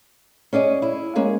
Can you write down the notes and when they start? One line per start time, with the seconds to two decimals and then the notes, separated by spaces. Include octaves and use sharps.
0.53 C#4 G#4 D5 D#5
0.82 E4
1.15 G#3 A#3 C#4 G#4